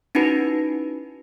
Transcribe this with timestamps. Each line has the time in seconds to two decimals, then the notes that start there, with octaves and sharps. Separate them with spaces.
0.15 C#4 D#4 E4 F#4 B4